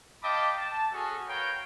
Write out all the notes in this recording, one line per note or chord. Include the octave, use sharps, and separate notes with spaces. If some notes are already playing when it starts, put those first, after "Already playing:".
D#5 F5 G5 A5 B5 D6
A5
C#4 F#4 G#4 A4
F#4 A#4 B4 C#5 F5 G5